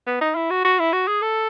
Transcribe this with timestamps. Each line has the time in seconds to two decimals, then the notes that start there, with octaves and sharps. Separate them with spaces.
0.07 B3
0.21 D#4
0.35 E4
0.50 F#4
0.65 F#4
0.79 E4
0.93 F#4
1.08 G#4
1.22 A4